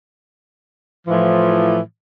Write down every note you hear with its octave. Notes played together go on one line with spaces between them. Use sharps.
A2 E3 F3